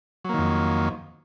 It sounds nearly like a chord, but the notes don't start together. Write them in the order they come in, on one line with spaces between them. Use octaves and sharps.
F#3 A#3 D#3 F2